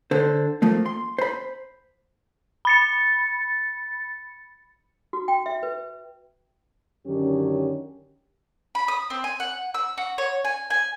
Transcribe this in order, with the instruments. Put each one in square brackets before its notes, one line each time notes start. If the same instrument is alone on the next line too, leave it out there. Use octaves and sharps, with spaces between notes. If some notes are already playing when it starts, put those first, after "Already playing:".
[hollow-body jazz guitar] D3 C5
F3 A3 A#3
C6
C5 B5
[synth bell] B5 A6 C#7
[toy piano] F#4
G5
E5
B4
[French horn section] F#2 D3 D#3 C#4 G4
[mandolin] B5
D#6
C4
G#5
F#5
E6
F#4
C#5
G#5
G#5